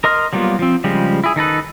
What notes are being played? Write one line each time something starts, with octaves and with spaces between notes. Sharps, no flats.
A#4 D#5 C6 F6
F#3 G3 A#3 B3 F4
F3 C4
C#3 F3 G3 G#3
E4 G#4
D#3 D#4 A4 B4